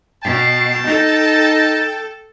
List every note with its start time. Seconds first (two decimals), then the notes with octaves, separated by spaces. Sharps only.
0.24 B2 G5 A5
0.87 D#4 A4